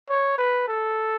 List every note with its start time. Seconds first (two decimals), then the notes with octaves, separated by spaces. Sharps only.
0.09 C#5
0.38 B4
0.68 A4